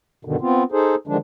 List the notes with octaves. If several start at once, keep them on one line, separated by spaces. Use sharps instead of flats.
G2 B2 D3 D#3
B3 C4 F4
D#4 G#4 A4 C5
D3 D#3 F3 G#3 D4